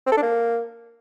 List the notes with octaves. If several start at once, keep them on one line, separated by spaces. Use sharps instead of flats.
C4
A4
D4
A#3